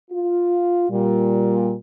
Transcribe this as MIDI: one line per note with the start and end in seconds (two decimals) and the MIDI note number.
0.11 0.88 65
0.90 1.74 46
0.90 1.74 55